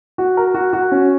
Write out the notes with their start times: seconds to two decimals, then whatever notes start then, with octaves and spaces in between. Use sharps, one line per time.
0.18 F#4
0.37 A#4
0.54 F#4
0.73 F#4
0.92 C#4